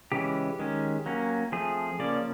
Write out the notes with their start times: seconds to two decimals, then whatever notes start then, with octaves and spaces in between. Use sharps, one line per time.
0.12 C#3 E3 G#3 C#4 G4
0.59 D#3 G#3 C#4
1.06 F#3 A#3 C#4
1.52 F3 A3 C4 G#4
1.99 C#3 F3 A#3 C#4 D5